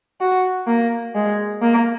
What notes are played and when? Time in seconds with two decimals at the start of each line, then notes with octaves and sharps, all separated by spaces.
0.21 F#4
0.67 A#3
1.15 G#3
1.62 A#3